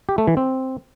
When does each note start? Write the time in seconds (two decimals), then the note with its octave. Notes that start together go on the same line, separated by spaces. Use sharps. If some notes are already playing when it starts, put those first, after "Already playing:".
0.09 G4
0.18 A3
0.27 E3
0.37 C4